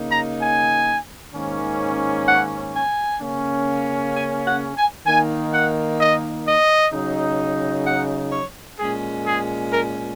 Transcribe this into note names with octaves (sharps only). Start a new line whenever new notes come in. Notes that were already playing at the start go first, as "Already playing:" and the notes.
Already playing: C#3 A#3 D#4
A#5
G#5
G#2 D#3 A#3 C#4
F#5
G#5
C#3 A#3 C#4
G#5
F#5
G#5
D#3 A#3 D#4 G#5
F#5
D#5
D#5
C#3 F#3 D#4
F#5
C#5
A#2 G#3 C#4 G#4
G#4
A#4